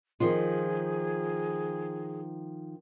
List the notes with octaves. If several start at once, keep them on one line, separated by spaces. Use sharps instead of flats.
D#3 F3 F4 G#4